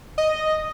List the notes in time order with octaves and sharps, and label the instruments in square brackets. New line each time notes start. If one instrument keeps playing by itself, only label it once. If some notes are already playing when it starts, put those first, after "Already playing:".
[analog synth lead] D#5